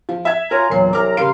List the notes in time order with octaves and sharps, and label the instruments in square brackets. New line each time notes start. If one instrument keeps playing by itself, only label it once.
[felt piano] F3
E5 G#6
[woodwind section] F4 G#5 A#5 [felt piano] A#4 C#5
[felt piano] E1 C7 [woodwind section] A#2 F#3
[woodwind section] C2 F#3 A#5 [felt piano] D6 F6
[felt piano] C#3 G3 D7 [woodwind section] A#4 F5 C6